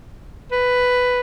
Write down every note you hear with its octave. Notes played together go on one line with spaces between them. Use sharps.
B4